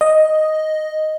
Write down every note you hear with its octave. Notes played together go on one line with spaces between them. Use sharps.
D#5